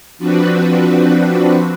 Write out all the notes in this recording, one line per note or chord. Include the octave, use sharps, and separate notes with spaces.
F3 C4 D4 F#4 B4